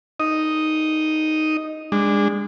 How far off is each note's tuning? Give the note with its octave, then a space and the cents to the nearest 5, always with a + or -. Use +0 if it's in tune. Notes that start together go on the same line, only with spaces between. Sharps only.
D#4 +0 D#5 +0
G#3 -25 D4 +0